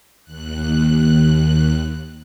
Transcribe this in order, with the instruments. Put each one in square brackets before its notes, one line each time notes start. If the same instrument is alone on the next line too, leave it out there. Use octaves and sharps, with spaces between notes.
[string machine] D#2 F#6